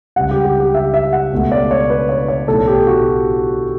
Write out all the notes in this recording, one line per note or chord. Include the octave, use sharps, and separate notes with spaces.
C#2 C#3 G3 F#5
G4
G4
G4
E5
E5
F#5
C#2 B2 A3
D5
C#5
B4
C#5
C#5
B1 A2 E3 A3 A4
G4
F#4